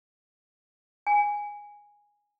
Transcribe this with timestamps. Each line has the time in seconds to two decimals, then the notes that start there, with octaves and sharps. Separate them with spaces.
1.07 G#5